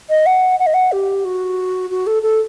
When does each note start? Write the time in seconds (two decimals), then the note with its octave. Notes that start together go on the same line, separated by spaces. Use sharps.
0.10 D#5
0.26 F#5
0.59 F#5
0.66 D#5
0.74 F#5
0.92 G4
1.25 F#4
1.90 F#4
2.07 A4
2.23 A4